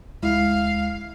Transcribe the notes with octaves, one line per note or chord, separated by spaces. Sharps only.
D2 G#3 E4 F5